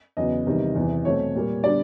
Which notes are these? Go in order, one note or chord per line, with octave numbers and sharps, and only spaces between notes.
E2 C#3 F#3 B3 D#5
E2 C3 D#3 G3
E2 C3 E3
B2 F#3 A3 C4 C#5
A#2 G3 A#3
D3 G3 B3 D4 D5